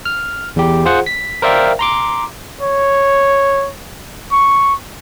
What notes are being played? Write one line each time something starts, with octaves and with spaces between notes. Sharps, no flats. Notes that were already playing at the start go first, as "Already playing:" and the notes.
F6
E2 G4
F4 G#4 C5 F#5
B6
A#4 C5 D5 E5 F5 G5
A#5 C6 D6
C#5
C#6